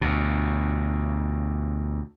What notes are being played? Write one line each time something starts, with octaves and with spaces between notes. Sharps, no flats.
D2 B2